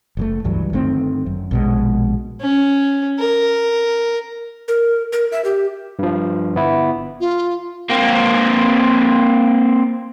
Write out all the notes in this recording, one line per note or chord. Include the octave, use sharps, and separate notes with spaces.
F#1 A2 A3
C#2 G2 E3 F#3
G1 D#3 A3 C4
F#2
A#1 B2 G#3
C#4
A#4
A#4
A#4
E5
G4
G2 F3
G1 B3 E4
F4
A#3 C4